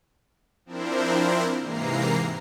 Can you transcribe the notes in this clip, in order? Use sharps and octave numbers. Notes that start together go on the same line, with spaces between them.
F3 C4 D4 E4 A#4 C5
G#2 C3 E3 A#3 A#5 C7